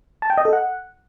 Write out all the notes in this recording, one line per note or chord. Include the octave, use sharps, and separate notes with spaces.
A5
G5
D#5
A4
F#5